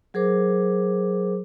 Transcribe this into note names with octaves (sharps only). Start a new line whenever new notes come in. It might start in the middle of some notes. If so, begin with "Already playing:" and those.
F#3 G#4 A#4 C5 D6